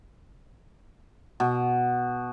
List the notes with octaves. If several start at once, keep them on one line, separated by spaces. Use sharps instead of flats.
B2